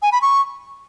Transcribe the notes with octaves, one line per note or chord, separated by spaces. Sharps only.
G#5
B5
C#6